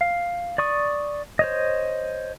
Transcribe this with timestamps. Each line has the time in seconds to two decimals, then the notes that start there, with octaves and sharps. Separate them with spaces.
0.01 F5
0.58 D5 C#6 D#6
1.39 C5 C#5 D#5